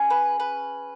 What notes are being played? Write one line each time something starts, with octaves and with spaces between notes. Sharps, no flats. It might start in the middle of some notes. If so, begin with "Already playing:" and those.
Already playing: C#4 G#4
B4
B4